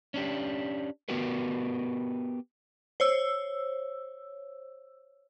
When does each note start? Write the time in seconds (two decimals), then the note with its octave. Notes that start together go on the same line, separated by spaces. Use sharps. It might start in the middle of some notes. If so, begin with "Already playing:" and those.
0.14 C#4 D4 G4
1.09 B3 F#4 G4 A#4 B4
3.00 C5 C#5 E6